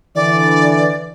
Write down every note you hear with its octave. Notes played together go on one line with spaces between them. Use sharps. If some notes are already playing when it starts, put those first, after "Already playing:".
D3 E3 D5